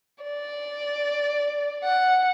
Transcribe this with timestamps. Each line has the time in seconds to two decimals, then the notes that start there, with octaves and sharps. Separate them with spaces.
0.23 D5
1.84 F#5